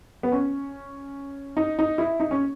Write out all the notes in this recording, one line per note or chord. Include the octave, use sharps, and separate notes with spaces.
B3
C#4
D#4
D#4
E4
D#4
C#4